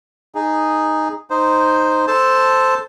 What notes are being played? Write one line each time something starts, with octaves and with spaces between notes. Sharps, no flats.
D#4 G#4
D#4 C5
A4 C5 A5